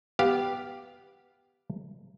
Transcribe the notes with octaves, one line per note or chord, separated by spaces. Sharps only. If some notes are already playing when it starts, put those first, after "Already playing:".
B3 G4 F5